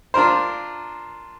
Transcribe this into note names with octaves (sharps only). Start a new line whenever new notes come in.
D4 F4 A#4 C5